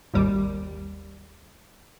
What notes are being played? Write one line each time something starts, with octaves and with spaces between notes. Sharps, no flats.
G#1 D#2 G3